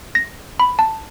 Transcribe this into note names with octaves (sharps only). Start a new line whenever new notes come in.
A#6
B5
A5